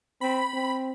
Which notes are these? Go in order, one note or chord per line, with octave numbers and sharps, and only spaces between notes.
C4 B5
C4